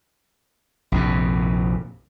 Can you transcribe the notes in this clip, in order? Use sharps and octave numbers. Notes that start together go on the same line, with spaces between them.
A#1 F2 C3